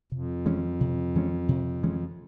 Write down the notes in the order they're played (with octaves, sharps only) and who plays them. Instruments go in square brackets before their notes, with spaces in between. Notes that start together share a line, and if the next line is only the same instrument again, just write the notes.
[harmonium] F2 [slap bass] C3
[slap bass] E3 G#3 C#4
C3
E3 G#3 C#4
C3
E3 G#3 C#4